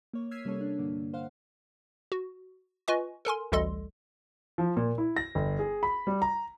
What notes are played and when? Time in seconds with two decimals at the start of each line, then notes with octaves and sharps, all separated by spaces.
0.13 A#3 C#5
0.31 E6 F6 G#6 B6 C7 D#7
0.45 C3 G3 A#3 C#4 A4 C#5
0.61 D4
0.79 G2 D3 A#3
1.14 C5 F5 F#5
2.12 F#4
2.88 F4 B4 D#5 G#5 C#6
3.25 A4 A#4 G#5 C6
3.52 A1 D2 G3 A4 D#5 C6
4.58 F3
4.77 A#2
4.98 E4
5.17 A#6
5.35 G1
5.59 G#4
5.83 B5
6.07 G3
6.22 A#5